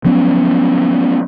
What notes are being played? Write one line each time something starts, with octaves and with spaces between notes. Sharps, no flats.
F3 F#3 B3 C#4